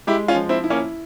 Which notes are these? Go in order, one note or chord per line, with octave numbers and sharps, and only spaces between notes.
G#3 E4 G4
C#4 F4
F3
C4 E4
E4
A#3 C#4